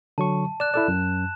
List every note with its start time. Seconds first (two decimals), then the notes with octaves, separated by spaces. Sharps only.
0.18 D3 F#3 A5 C#6
0.60 D5 F#6 E7
0.74 E4 A4 D5 E7
0.88 F#2